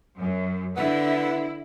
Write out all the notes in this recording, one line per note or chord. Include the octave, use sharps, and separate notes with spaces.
F#2
D3 B3 E4